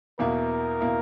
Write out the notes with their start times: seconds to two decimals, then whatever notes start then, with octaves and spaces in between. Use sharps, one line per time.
0.19 E2 B2 A#3 E4 A#4
0.81 B2 A#3 E4